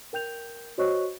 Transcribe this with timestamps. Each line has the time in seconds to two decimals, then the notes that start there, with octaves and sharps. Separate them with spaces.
0.13 A#4 G5 G6 F7
0.78 F#4 C5 C#5 D#5 C#6 F#6